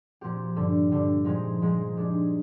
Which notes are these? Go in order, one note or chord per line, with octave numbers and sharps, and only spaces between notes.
A#2 F3 C4 G4
G2 D3 G3
G2 D3 G3
A#2 F3 G#3 C4 D#4
A#2 F3 G#3 C4 D#4
A#2 G#3 D4 G4